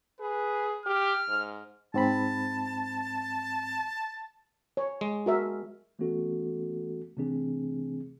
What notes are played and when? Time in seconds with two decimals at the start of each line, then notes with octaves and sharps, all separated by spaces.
0.21 G#4 B4
0.86 G4 F6
1.29 G#2
1.94 G#2 C4 A5 B5
4.77 C#5
5.01 G#3
5.26 F#4 A#4 E5
5.99 E3 A3 B3 C#4 F#4 A4
7.17 C3 E3 A3 C4 D4 G#4